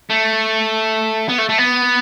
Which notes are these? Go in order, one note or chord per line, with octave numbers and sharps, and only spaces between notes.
A3
B3
A3
A3
B3